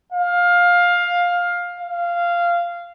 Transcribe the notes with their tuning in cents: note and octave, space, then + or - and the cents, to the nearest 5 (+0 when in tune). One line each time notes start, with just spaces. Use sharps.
F5 +15
F5 -10